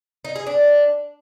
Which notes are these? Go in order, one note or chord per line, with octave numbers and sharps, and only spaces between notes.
D#4
G#4
D4